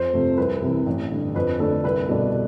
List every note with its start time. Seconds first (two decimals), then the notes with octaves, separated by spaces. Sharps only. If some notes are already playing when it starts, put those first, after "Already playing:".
Already playing: F2 C5
0.13 C3 F3 A3 C4
0.37 C2 B4
0.62 C3 E3
0.86 A1
1.11 G2 D3
1.35 F2 B4
1.59 D3 A3 D4 A4
1.84 C2 B4
2.08 B2 G3 D4 A4